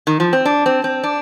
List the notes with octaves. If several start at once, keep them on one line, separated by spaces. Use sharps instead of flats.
D#3
F3
C4
D4
C4
C4
D4